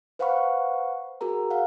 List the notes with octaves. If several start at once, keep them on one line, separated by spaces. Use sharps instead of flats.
B4 C5 F5 F#5 B5 C#6
F#4 G#4 A#4 A#5
F5 F#5